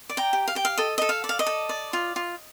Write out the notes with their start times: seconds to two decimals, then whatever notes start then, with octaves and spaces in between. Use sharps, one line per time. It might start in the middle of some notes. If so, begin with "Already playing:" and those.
0.09 D5
0.17 G5 A#5
0.33 G4
0.48 F5
0.55 G4 G5
0.65 F5
0.78 A4 D#5
0.98 A4 D#5
1.09 F5
1.24 D5
1.29 F5
1.39 D#5
1.46 A4
1.69 D5
1.93 F4
2.16 F4